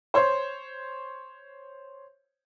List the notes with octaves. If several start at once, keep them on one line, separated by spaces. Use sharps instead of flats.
C5 C#5 C6